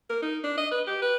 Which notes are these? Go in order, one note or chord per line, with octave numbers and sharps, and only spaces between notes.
A#4
D#4
D4
D#5
B4
G4
B4